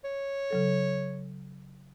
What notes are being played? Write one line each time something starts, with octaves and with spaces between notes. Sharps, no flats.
C#5
C#3 F#3 A4